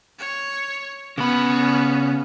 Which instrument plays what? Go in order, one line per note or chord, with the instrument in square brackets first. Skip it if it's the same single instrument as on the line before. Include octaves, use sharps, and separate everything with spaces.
[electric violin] C#5
[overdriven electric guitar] C#3 B5 [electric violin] B3 C#4